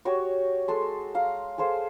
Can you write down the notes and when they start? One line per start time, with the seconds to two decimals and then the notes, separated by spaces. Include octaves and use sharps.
0.05 F#4 G4 C#5
0.68 G#3 A4 C6
1.15 F5 A#5
1.58 G#4 A4 C5 F5